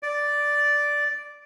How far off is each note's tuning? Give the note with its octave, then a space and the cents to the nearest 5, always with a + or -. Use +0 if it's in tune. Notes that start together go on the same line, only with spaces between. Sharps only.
D5 -5